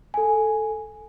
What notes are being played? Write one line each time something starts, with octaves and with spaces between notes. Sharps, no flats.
A4 G#5